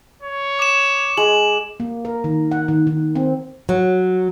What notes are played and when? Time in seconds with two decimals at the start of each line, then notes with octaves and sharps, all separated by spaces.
0.22 C#5
0.59 D6 E7
1.17 G#3 F#7
1.80 A#3
2.05 A#4
2.24 D#3
2.51 F#5
2.68 D#3
2.87 D#3
3.15 C4
3.69 F#3